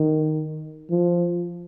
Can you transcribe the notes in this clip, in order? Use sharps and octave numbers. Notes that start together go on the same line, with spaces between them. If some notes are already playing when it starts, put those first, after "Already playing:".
Already playing: D#3
F3